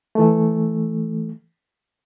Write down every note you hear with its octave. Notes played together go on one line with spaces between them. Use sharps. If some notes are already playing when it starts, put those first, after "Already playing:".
E3 A3